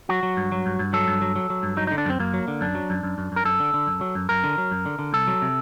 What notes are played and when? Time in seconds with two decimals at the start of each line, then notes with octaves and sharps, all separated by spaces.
0.09 F#3 F#4
0.23 F#3
0.37 G2
0.52 F#3
0.66 G2
0.79 G2
0.93 F#3 A4
1.08 G2
1.21 F#3
1.36 F#3
1.50 F#3
1.63 G2
1.77 F#3 D#4
1.87 D3 D#4
1.98 D4
2.06 F#2 C4
2.19 F#2 A#3
2.34 F#3
2.48 D3
2.61 F#2 D4
2.75 F#3
2.90 F#2
3.03 F#2
3.18 F#2
3.32 F#2
3.36 A#4
3.45 F#2 A4
3.60 D3
3.74 D3
3.87 F#2
4.01 F#3
4.15 F#2
4.29 F#2 A#4
4.44 D3
4.58 F#3
4.71 F#2
4.86 D3
4.99 D3
5.13 C2 A4
5.27 F#3
5.42 C3